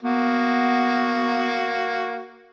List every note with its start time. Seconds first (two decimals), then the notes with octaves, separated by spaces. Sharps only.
0.03 A#3 B3 F#4